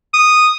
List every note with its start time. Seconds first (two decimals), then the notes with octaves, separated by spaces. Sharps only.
0.14 D#6